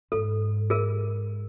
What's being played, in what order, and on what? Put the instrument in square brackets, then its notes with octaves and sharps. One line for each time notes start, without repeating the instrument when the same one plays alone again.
[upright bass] G#2 [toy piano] A4
[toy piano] G#4 A#4